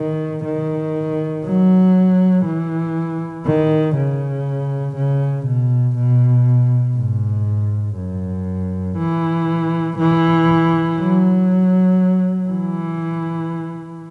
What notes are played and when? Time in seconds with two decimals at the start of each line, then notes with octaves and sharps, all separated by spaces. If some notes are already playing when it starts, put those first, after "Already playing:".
Already playing: D#3
0.45 D#3
1.45 F#3
2.46 E3
3.46 D#3
3.96 C#3
4.96 C#3
5.46 B2
5.96 B2
6.96 G#2
7.97 F#2
8.98 E3
9.99 E3
10.99 F#3
12.49 E3